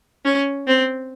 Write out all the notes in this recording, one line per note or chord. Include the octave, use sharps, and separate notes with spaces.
C#4
C4